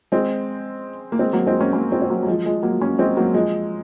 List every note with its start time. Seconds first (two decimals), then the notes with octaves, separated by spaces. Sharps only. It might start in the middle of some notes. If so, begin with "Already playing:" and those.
0.12 G#3 C4
1.12 A#3
1.19 G#3 C4
1.33 F#3 A#3
1.46 G#3 C4
1.60 A#3 C#4
1.73 A#3 C#4
1.92 G#3 C4
2.02 C4
2.10 F#3 A#3
2.23 F#3
2.27 F3 G#3
2.45 F3 G#3
2.63 F#3 A#3
2.81 A#3 C#4
2.99 G#3 C4
3.17 F#3 A#3
3.34 F3 G#3